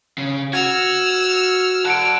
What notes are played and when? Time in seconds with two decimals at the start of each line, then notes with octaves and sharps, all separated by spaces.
0.18 C#3
0.53 F#4 E6 F6 G#6 F7
1.85 F#5 A5 F#6 C#7 D7